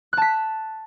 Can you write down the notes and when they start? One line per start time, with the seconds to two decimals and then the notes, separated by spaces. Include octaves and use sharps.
0.13 F#6
0.17 A5
0.22 B6